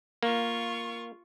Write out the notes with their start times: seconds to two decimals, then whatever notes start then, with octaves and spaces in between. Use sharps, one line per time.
0.23 A#3 F4 C#6